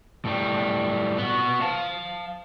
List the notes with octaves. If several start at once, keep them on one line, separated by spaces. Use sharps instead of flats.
A2 G3
B3 F#4
F5 A5